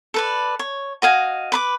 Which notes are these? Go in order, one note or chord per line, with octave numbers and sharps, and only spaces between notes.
A4 B4 D5
C#5
F#4 D#5 F5 G#5
B4 B5 D6